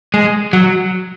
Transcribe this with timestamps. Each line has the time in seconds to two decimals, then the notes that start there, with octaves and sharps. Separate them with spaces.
0.14 G#3
0.53 F#3